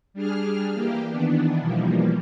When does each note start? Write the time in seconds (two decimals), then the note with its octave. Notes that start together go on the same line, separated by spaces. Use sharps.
0.14 G3 D4 G#4 F6
0.74 E3 A#3 G4
1.10 D#3 E3 B3 D4
1.60 B2 E3 F3 G3 A#3